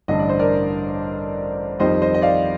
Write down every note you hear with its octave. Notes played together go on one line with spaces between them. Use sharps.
A1 G2 D3 D#5
D5
C5
A#4 D5
F2 D#3 G3 C5 D#5
C5 D#5
D#5
D5 F5